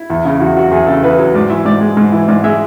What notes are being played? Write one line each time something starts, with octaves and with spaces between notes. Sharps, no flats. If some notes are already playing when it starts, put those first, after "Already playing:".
Already playing: E4
E2
C#3
E2 F#4
F#3 F#4
E2 G#4
C#3 A4
E2 B4
F#3
G#2 D5
E3 E5
G#2 D5
G#3
G#2
E3
G#2 D5
G#3 E5